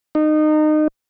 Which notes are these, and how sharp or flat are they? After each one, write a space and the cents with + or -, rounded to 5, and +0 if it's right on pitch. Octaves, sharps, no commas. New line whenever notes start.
D#4 -25